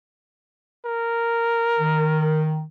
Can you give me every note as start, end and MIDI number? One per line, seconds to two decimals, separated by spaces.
0.85 2.55 70
1.79 2.62 51